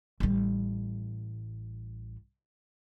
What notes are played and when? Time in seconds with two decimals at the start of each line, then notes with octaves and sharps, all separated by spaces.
0.20 A1 G3